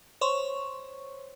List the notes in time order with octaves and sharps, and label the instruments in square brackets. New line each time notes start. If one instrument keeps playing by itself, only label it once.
[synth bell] C5 C#5 C6 C#6